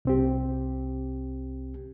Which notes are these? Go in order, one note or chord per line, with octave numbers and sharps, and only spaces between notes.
C2 C4 G4